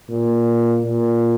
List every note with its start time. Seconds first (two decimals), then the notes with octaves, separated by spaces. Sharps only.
0.10 A#2
0.81 A#2